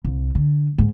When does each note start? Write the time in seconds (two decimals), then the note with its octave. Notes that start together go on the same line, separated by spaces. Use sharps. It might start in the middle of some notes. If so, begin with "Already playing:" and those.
0.05 C2
0.35 D3
0.78 G#2